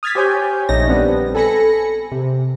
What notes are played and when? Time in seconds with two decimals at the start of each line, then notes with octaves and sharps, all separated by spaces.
0.03 D#6 F6 G#6 A6 B6
0.15 G4 C5 C#5 G#5 G6
0.69 A#1 A3 D#4 C#5 A#6
0.87 G3 B3 C4 D4
1.35 A4 G#5 B5 A#6 C#7
2.11 C3